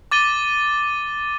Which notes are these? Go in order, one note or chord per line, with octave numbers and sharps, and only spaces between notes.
D6 A6 D#7 G7